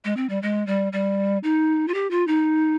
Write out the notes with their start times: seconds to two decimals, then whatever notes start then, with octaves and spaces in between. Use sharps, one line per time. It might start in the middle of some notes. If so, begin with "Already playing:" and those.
0.04 G#3
0.17 C4
0.29 G3
0.42 G#3
0.67 G3
0.92 G3
1.43 D#4
1.88 F4
1.94 G4
2.11 F4
2.27 D#4